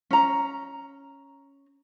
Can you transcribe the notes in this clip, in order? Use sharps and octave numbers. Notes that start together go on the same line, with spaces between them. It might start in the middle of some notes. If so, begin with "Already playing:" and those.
C#4 A#5